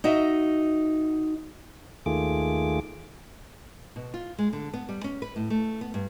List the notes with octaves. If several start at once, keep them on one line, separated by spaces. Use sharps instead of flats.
D#4 F#4 D#5 E5
D#2 D#3 A3 F4 G#4 D6
B2
F4
G#3
D3
B3
G3
C#4
B4
A2
A3
B3
G2